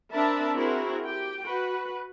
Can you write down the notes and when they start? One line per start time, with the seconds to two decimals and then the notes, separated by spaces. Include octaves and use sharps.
0.12 C4 D4 A#4 E5 A5 B5
0.56 C4 E4 F#4 G#4 A#4
1.05 G4 G5
1.45 F#4 B4